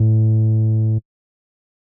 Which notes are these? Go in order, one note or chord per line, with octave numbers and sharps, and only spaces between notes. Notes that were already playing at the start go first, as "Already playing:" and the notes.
Already playing: A2